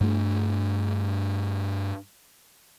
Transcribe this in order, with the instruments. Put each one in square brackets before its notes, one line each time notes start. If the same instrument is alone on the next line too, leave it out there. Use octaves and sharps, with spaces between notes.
[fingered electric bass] G2 A3 D4